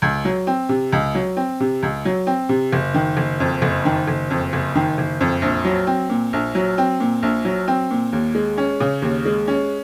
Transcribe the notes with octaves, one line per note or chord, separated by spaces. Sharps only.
C#2
F#3
C4
C3
C#2
F#3
C4
C3
C#2
F#3
C4
C3
F#1
D#3
F#1
F2
F#1
D#3
F#1
F2
F#1
D#3
F#1
F2
A#1
F#3
C4
A#2
A#1
F#3
C4
A#2
A#1
F#3
C4
A#2
D#2
G#3
C#4
C#3
D#2
G#3
C#4